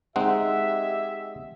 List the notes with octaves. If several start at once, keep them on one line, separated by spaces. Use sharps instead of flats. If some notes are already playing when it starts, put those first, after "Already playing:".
G#3 C4 D#4 G4 G#4 E5 F#5